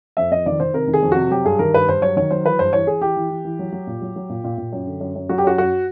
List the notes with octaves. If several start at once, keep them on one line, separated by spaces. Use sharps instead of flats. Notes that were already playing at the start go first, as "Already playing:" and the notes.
F2 E5
F2 D#5
D#3 D5
D#3 C5
C3 A#4
D#3
G#4
F2
C3 F#4
F#3 G4
G2 G#4
D#3 A#4
G2 B4
G2 C5
F#3 C#5
D#3 C#5
F#3 C5
E3 B4
G2 C5
E3 C#5
E3 G#4
E3 G4
E3
E3
E3
F#3
F#3
A#2
F#3
F#3
A#2
A#2
A#2
F#2
D3
F#2
F#2
F#3 F#4
G4
F#2 F#4
F#2 F#4